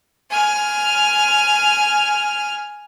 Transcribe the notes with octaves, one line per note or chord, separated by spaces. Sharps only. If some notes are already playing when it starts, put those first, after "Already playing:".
G#5 F6